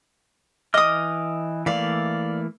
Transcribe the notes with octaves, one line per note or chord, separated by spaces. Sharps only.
E3 D#5 D6 D#6 F6
E3 A3 A#3 D5 F5